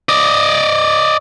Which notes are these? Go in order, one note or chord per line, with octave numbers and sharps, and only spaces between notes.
D5 D#5